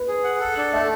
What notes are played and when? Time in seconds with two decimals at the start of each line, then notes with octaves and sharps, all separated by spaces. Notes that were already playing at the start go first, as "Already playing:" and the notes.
Already playing: B4
0.08 G#4
0.24 F#5
0.40 A4
0.57 D4
0.73 A3 E5